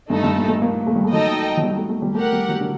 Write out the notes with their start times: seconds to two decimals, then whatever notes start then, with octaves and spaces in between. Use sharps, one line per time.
0.10 G2 A3 D#4 A4
0.24 G2
0.36 A#2
0.48 A3
0.62 A#3
0.87 A3
0.95 G3
1.04 A3
1.13 F#3 D#4 A4 D#5 G5
1.57 F#3
1.63 G3
1.77 A3
1.89 A3
2.02 G3
2.15 A3 G4 A#4 F#5
2.32 G3
2.49 F#3
2.60 D3